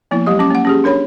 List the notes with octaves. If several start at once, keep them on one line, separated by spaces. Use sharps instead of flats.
F3 A#3 B3 E4
F#3 G#3 G4 D#5
C#4 D6
A#3 F#5
C#4 G4 G#4
D4 A#4 C#5 B5